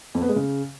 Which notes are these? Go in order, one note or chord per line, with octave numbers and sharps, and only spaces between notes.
F2
B3
G#3
C#3